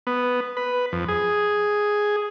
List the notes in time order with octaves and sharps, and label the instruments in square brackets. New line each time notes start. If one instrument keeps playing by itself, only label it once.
[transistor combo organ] B3
B4
F2
G#4